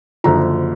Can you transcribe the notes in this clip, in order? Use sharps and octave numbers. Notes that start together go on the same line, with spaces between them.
F#1 F#2 D3 F3 A#5